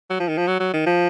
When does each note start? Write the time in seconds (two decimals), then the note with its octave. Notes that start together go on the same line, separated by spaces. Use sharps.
0.10 F#3
0.20 F3
0.29 D#3
0.38 F3
0.48 F#3
0.60 F#3
0.73 D#3
0.86 F3